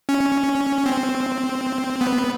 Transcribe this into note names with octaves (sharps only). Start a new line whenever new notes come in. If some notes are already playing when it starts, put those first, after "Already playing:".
C#4
C4
B3